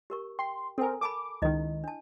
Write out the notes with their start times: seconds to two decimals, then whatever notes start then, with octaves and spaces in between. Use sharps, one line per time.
0.10 G4 A#4 C#6
0.39 G5 C6
0.78 C4 A4 A#4 G#5
1.01 A#4 A5 B5 D6
1.42 C#2 D#3 E4 D#5
1.84 D4 A5